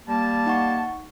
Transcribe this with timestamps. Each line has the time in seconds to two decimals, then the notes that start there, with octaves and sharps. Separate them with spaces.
0.07 G3 A#3 A5
0.46 D#4 F#5 C#6